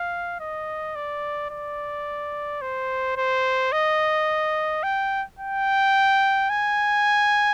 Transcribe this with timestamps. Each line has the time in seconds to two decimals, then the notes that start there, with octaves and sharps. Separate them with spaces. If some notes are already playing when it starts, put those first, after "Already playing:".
Already playing: F5
0.40 D#5
0.96 D5
1.51 D5
2.61 C5
3.17 C5
3.72 D#5
4.83 G5
5.39 G5
6.50 G#5